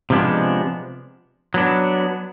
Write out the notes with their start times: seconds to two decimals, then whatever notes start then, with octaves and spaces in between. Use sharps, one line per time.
0.10 C3 F3 G#3 B3 D4
1.54 F#3 B3 D4